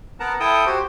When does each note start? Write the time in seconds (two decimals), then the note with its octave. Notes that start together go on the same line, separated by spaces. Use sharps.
0.20 B3 A#4 F#5 A5 A#5
0.40 E4 A4 G5 A5 D#6
0.66 F#4 G4 C5